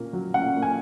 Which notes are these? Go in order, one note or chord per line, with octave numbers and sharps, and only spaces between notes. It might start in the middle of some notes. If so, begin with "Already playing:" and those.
Already playing: A#2 A#3 C#4
F#3
C#4 F#5
A#3
G#5